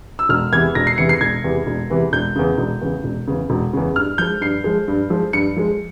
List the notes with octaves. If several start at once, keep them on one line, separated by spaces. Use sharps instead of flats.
E6
E1 F6
E2 C3 E3 G#6
E1 A#6
C7
E2 C3 E3 C#7
C7
E1 G#6
E2 C3 E3
E1
E2 C3 E3
E1 G6
E2 C#3
E1
E2 C#3
E1
E2 C#3
E1
E2 C#3
G2 F6
F3 G#3 G6
G2 C7
F3 G#3
G2
F3 G#3
G2 C#7
F3 G#3